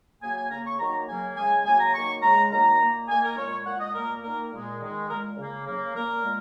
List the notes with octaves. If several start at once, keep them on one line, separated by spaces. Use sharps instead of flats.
C#3 F#3 A#3 G#5
G#5
C#3 A#3 A#5
C#6
D#3 F#3 A#3 A#5
C#3 F#3 A#3 G#5
C#3 G#3 G#5
C#3 F#3 A#3 G#5
A#5
D#3 F#3 A#3 C#6
C#3 G#3 A#5
D#3 F#3 A#3 A#5
A#2 A#3
D#3 A#3 G#5
A#4
A#2 G#3 C#5
A#2 G#3 F#5
D#5
A#2 A#3 A#4
D#3 A#3 A#4
A#2 G#3
D#3 G#3
A#2 G#3 A#4
C#3 A#3
C#3 F#3 A#3
A#2 A#3 A#4
A#2 G#3